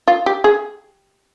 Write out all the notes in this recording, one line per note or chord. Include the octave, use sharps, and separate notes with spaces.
F4
G4
G#4